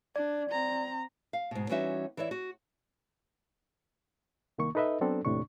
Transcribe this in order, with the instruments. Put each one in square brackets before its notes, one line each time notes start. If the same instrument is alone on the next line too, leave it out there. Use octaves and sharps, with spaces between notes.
[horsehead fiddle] D4 [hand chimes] D5
[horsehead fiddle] C4 A#5
[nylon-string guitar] F5
G#2 B2
E3 G3 C#4 D#4 F#4 E5
E3 E4 C#5 D5 E5
F#4
[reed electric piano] C2 D#3 A#3 C#6
D#4 A4 B4 D#5 E5
F#3 B3 C4 D4 A4
D#2 A2 C3 D4 C#6